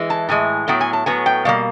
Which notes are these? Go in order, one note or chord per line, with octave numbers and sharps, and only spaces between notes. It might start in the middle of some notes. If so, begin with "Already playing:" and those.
Already playing: E3 G#3
A5
A2 E3 G#3 G#5
A2 F#3 B3 G5
G#5
A5
A2 F#3 B3 G#5
G5
B2 G3 A#3 F5